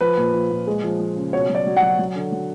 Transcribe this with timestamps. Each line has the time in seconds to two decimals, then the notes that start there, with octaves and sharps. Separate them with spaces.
0.01 F3 B4
0.17 A#2
0.34 F3
0.51 A#2
0.67 G#3
0.83 F3
1.00 F3
1.16 C#3
1.33 B2 C#5
1.49 F#3
1.55 D5
1.67 F#3
1.77 F#5
1.82 F#3
1.99 F#3
2.16 D3
2.32 F#3